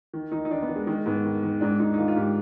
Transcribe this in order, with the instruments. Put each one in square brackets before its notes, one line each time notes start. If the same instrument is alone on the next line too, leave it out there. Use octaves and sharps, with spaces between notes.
[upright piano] D#3
D#3 D#4
D#4
D#3 D4
B3
D#3
G#3
D#3 G#3
G#2 B3
D#3
D#3
G#2 D4
G#2 D#4
D#4
D#3 F4
F4
G#2 G4